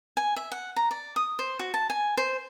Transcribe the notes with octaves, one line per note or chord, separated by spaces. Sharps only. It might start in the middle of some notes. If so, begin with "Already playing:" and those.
G#5
E5
F#5
A#5
D5
D#6
C5
F#4
A5
G#5
C5